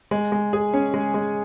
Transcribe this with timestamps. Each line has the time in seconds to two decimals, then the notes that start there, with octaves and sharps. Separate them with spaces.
0.11 G#3
0.32 G#3
0.53 G#4
0.74 C#4
0.94 G#3
1.14 G#3